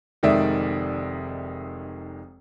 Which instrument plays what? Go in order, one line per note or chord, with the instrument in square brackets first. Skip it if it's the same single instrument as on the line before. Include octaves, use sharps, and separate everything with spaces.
[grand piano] F1 D#3 G#3 D5 E5